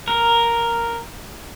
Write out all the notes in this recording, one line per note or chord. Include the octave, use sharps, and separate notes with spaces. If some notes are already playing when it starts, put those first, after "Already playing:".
A#4